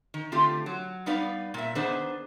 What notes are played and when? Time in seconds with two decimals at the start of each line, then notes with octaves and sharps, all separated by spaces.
0.14 D#3
0.32 D3 A3 C4 F4 G4
0.66 F#3
1.06 G3 B3 D#4 B4 D5 F5
1.54 A#2 E5
1.75 D#3 B3 D4 G#4 C5